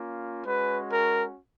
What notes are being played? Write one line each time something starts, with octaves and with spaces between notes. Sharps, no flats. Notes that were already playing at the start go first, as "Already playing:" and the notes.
Already playing: A#3 C#4 F4
G#3 C#4 F#4 B4
A#4